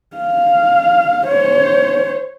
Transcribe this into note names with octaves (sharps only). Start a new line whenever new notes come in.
F5
C5 C#5